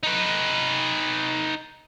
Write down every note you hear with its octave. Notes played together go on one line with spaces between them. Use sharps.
D#4 B4